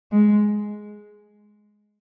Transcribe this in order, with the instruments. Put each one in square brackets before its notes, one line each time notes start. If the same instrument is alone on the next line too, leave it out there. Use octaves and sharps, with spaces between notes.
[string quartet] G#3